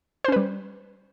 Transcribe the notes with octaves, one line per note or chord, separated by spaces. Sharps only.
G3 C#4 B4 C5